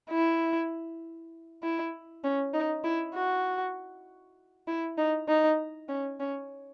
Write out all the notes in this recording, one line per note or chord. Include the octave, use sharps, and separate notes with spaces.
E4
E4
C#4
D#4
E4
F#4
E4
D#4
D#4
C#4
C#4